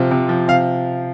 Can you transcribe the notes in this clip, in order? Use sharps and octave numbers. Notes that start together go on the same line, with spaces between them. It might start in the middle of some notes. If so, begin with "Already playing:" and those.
Already playing: C3 F3 F4
C3
F3
C3 F5